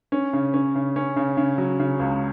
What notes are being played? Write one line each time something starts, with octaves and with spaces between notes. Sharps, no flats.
C#4
C#3
C#4
C#3
C#4
C#3
C#3
F#3
C#3
C#2